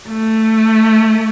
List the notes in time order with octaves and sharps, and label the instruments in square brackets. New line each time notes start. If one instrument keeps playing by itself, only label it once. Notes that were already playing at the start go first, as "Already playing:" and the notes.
[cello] A3